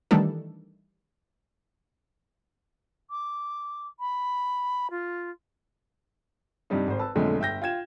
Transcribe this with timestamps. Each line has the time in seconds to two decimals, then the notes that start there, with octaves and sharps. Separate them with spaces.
0.11 D#3 E3 G3 A3 D4 A4
3.10 D6
4.00 B5
4.91 F4
6.70 G2 C3 G3 D#4
6.88 G#1 C5
6.99 B4 A5 E6
7.15 B1 F2 D3 G#3 A3
7.40 G1 E5 G5 G6 A#6
7.62 F4 G5 G#6 E7